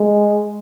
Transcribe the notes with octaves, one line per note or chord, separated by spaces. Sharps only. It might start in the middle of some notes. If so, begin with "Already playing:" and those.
Already playing: G#3